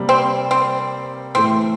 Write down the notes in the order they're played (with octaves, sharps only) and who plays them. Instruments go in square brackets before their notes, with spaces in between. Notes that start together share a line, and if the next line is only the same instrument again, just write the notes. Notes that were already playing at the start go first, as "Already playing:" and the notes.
Already playing: [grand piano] C3 G3 A#3
[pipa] C4
C4
[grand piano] A2 E3 A3 [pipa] C4